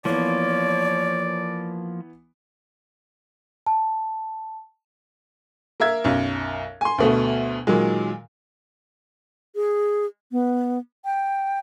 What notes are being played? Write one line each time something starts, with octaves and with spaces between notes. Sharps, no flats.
E3 F3 A#3 B3 C#5 D5
A5
A#3 A#4 E5 G#6
B1 F#2
G#5 C6
D2 B2 A3
A#2 D#3 F#3 G#3
G#4
B3
G5